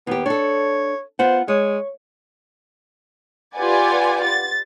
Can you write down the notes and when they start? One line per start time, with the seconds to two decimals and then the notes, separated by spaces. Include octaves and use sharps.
0.07 D#2 B3 G4
0.26 D4 A4 C#5
1.19 B3 F4 C5 F#5
1.48 G#3 C#5
3.57 F4 G4 B4 D5 F#5 G#5
4.24 A6